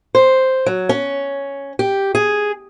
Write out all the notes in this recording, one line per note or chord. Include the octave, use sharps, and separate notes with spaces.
C5
F#3
C#4
G4
G#4